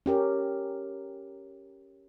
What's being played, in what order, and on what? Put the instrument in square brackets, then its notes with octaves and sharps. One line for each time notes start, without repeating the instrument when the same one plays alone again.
[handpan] C#4 G4 A#4